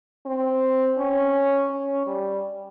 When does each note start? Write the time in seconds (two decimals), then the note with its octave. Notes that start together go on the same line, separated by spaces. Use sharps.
0.26 C4
0.98 C#4
1.71 C#4
2.07 G3